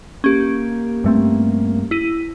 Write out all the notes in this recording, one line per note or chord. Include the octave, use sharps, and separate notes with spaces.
A#3 C#4 G4
G2 A3 C4
E4 D#7